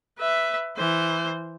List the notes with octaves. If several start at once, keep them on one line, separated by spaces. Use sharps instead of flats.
B4 E5
E3 C5